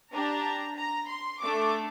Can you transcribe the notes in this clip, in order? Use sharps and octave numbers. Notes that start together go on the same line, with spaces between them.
D4 G4 A#5
A#5
C6
A3 D4 A4 D6